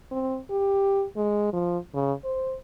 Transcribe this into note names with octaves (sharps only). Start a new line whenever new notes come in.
C4
G4
G#3
F3
C#3
C5